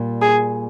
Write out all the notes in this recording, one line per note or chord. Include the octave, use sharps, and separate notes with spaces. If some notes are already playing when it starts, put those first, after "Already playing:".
Already playing: A#2 G3 A#3
G#4